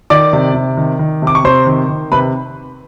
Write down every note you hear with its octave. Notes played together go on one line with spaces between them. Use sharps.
D#3 D5 D6
C3
C3
D#3
D#3
C3 D6
C#6
C3 C5 C6
D#3
D#3
C3 B4 B5